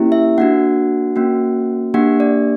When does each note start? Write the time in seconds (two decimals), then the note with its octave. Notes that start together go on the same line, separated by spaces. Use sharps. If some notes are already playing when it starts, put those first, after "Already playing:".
Already playing: A#3 C#4 E4 G4
0.12 E5
0.38 A#3 D4 F#4 F#5
1.16 A#3 C#4 F#4
1.94 A#3 D4 G4 F#5
2.20 D5